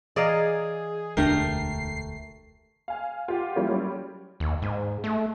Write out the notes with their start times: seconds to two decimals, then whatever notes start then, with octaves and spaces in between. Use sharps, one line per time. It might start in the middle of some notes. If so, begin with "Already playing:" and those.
0.16 E3 G#4 D5 D#5 F5 A#5
1.17 E1 D2 A3 D4 G4 A#4 C7
2.88 F5 G#5 F6
3.28 F4 G4 F#5 D6
3.56 E3 F#3 G3 A3 A#3 C#4
3.68 F#3 G3 C#4
4.40 D#2
4.62 G#2
5.04 A3